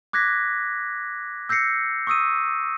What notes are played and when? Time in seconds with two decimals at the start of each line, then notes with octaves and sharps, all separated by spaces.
0.13 D6 F#6 G#6 A#6 B6
1.49 E6 G6 A#6 C7 C#7
2.07 C#6 D#6 E6 D#7